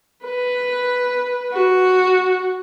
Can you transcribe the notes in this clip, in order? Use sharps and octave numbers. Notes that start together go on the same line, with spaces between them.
B4
F#4